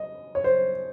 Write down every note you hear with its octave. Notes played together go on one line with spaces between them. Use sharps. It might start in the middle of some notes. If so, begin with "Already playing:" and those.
Already playing: D#5
C#5
C5